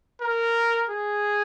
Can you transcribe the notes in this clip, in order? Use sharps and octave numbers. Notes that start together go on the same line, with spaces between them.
A#4
G#4